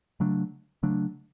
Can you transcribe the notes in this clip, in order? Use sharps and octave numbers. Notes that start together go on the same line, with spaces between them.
C#3 F#3 A3 D4
C#3 F#3 A3 D4